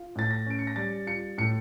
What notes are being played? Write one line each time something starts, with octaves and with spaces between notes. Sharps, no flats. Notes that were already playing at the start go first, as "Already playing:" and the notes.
Already playing: F4
A2 A6
A#6
C#4 D7
C#7
A#6
G3 A6
F4 C#7
A2 C#7